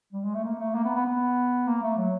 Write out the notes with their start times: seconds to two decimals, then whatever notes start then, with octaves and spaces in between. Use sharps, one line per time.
0.13 G3
0.23 G#3
0.34 A3
0.44 A#3
0.59 A3
0.75 A#3
0.84 B3
0.95 B3
1.06 B3
1.67 A#3
1.82 A3
1.97 F#3